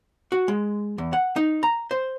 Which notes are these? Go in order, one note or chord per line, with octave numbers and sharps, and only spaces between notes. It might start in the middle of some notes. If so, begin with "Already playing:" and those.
F#4
G#3
E2
F#5
D#4
A#5
C5